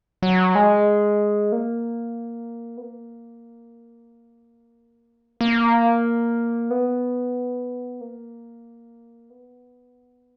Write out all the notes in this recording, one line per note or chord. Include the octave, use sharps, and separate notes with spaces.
F#3
G#3
A#3
B3
A#3
A#3
B3
A#3
B3